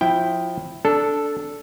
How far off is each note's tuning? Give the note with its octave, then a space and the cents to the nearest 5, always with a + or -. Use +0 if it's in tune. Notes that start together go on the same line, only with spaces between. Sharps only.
F3 +20 E4 +0 G5 +0
D4 -10 A4 +0